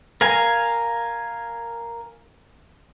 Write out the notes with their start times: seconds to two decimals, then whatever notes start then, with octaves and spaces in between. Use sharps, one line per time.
0.21 A#4 F5 G#5